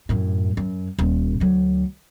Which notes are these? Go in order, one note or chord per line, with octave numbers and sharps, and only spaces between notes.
F#2 A2
F#2
D#1 A#2
D2 F#3